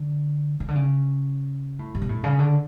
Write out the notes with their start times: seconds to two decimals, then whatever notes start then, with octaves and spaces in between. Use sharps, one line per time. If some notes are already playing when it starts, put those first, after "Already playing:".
Already playing: D3
0.60 C#3
0.68 D3
0.76 C#3
1.79 A2
1.95 G2
2.02 B2
2.09 A2
2.24 C#3
2.39 D3